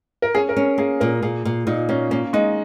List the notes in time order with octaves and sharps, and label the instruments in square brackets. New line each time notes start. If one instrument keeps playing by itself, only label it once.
[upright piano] A#4
[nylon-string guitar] C#4 [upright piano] G#4
[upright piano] A#4
[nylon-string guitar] C#4
[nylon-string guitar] A#3 [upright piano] G#4
[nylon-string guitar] A#2 [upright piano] A#4
[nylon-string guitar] A#2 [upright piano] G#4
[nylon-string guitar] A#2
[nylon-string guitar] A#2 [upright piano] D#4
[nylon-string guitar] A#3 [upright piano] C#4
[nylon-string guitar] A#3 [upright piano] C#4
[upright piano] G#3 [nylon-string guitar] D#4